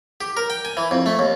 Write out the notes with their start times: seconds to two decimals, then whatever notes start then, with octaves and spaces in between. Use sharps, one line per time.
0.21 G4
0.37 A#4
0.50 G5
0.65 G#5
0.77 E3
0.91 F2
1.06 A3
1.19 D#2